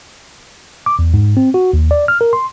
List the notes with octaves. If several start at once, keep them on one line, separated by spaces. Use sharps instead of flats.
D6
E2
G#2
C4
F#4
D#2
D5
F6
A#4
C6